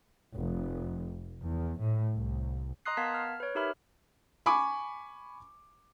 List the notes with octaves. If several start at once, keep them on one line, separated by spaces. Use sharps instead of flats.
F1
E2
A2
C2
D#5 A#5 C6 D#6 F#6 C7
B3 A#4 F5 A5 G#6 B6
F6
B4 C#5
D#4 G4 A#4 E5 B5 F6
G#5 B5 C#6 D6